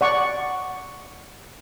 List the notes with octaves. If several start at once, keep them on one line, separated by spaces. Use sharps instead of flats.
D5 F#5 C#6